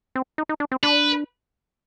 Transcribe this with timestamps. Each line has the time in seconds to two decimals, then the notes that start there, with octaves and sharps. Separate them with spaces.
0.15 C4
0.38 D#4
0.49 D#4
0.60 D4
0.72 C4
0.83 D4 B4